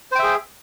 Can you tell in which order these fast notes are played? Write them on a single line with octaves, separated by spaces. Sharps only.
C5 G5 E5 G#4